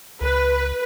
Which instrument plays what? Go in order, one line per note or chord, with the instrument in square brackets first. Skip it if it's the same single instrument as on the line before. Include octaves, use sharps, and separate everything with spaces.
[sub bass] C#2 [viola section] B4